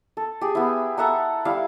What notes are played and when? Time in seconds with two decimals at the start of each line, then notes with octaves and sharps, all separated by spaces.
0.17 A4
0.41 G4 G#4
0.55 B3 E4
0.98 A4 E5 F#5 A#5
1.45 G3 E4 F5